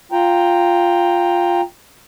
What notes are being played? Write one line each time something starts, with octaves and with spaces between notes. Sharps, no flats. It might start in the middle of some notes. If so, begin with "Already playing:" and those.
F4 G5 A#5